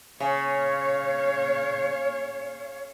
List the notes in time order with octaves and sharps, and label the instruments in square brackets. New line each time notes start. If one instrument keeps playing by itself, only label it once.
[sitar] C#3 [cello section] C#5 F5